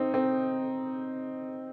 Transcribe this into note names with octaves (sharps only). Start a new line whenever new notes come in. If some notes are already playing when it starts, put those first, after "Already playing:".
Already playing: C4 D#4
C4